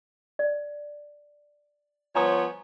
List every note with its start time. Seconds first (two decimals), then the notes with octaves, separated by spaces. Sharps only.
0.39 D5
2.15 F3 B3 C#5 G#5 A#5 D#6